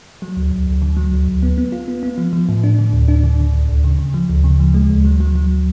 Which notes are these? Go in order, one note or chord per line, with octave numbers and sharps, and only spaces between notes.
F#3
D2
D2
D2
D3
F#3
D2
D2
B3
B3
F4
B3
B3
F3
F3
A2
D4
D3
D2
D4
D3
D3
D2
D2
C#3
C#3
F3
D2
C#3
F3
G#3
D2
F#3
F#3
F#3